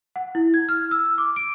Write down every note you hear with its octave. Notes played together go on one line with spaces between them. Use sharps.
F#5
E4
G#6
F6
E6
D6
D7